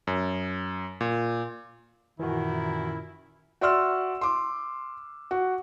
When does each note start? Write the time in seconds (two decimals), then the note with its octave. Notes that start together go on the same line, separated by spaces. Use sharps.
0.07 F#2
1.01 A#2
2.20 F#2 A#2 D#3 E3 E4 F#4
3.61 F#4 D5 E5 C6 E6 F6
4.21 C6 D6
5.31 F#4